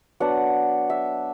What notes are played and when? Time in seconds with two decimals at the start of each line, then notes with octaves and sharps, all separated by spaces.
0.20 F#3 B3 D4 F#5
0.90 E5